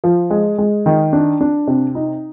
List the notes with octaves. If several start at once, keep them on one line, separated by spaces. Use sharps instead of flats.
F3
G#3
G#3
D#3
D4
D4
C3
D#4